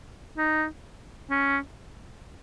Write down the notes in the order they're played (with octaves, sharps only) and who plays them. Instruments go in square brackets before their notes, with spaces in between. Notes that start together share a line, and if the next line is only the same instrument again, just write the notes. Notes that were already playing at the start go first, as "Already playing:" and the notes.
[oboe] D#4
C#4